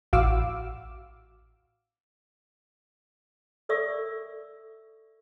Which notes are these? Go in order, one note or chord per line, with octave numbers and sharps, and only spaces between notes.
A1 F#4 F5 D6 E6
A4 A#4 D5 E5 C#6 E6